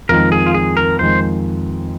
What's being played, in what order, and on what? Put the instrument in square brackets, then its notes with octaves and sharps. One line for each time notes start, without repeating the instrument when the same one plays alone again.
[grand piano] F2 D#3 G#3 [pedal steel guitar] A#4
[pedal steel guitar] G#4
F4
G#4
A#4
[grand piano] F2 D#3 G#3 [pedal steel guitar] C5